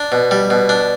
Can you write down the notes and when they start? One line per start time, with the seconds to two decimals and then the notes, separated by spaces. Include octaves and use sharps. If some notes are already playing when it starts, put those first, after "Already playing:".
Already playing: D4
0.12 B2
0.31 G3
0.50 B2
0.69 D4